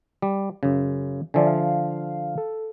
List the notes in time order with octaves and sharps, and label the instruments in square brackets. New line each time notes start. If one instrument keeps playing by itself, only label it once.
[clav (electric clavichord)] G3
F#2 C#3
[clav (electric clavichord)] D3 F3 [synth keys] D5 E5 G#5
[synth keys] F5
A4